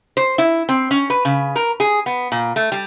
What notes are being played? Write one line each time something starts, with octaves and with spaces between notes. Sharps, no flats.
C5
E4
C4
C#4
B4
C#3
A#4
G#4
B3
A#2
A3
G3